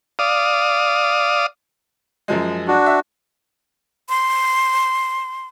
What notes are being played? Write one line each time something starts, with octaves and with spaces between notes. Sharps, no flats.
D5 F5 D#6
F#2 F3 G#3
D4 F#4
E5
C6